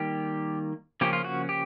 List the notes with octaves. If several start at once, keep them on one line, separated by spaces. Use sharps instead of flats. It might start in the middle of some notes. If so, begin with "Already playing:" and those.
Already playing: D#3 G3 A#3 G4
C#3 F3 A#3 C#4 G4
F4
F#4
G4